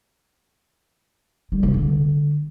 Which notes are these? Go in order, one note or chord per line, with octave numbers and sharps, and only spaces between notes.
G3
C#3
D3